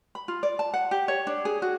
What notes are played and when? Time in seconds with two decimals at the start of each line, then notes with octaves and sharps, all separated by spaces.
0.15 B5
0.28 F4
0.43 D5
0.59 A5
0.74 F#5
0.91 G4
1.08 C#5
1.27 D4
1.45 G#4
1.62 F#4